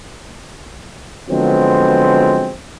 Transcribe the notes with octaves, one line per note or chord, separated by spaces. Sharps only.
D3 F3 F#3 G#3 B3 C4